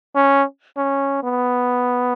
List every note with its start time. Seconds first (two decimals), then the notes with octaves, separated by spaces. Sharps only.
0.15 C#4
0.77 C#4
1.23 B3